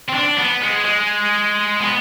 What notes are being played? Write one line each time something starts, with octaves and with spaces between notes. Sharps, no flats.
C4
D4
B3
G#3
G#3
B3